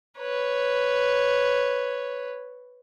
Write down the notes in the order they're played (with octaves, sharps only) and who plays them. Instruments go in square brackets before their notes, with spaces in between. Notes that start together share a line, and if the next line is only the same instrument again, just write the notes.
[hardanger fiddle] B4 C#5